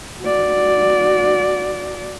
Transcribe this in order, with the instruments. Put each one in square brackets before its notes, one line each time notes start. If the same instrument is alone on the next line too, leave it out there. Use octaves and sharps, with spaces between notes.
[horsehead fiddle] F#4 D5